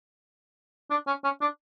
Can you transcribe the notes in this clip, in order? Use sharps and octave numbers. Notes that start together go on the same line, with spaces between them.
D4
C#4
C#4
D4